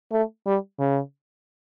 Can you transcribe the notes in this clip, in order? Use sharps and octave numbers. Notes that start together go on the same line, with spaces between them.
A3
G3
C#3